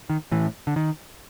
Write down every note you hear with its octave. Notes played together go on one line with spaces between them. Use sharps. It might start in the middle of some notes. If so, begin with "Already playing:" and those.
D#3
A2 E3
D3
D#3